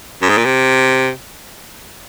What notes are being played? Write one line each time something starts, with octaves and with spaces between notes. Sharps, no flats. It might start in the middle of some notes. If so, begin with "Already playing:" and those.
F#2
G#2
A#2
C3